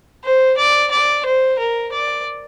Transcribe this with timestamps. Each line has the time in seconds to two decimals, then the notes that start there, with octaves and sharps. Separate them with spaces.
0.24 C5
0.57 D5
0.91 D5
1.26 C5
1.59 A#4
1.93 D5